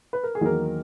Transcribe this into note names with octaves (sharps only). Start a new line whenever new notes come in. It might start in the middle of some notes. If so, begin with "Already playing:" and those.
B4
A#4
G#4
E2 D#3 F#3 A#3 A#4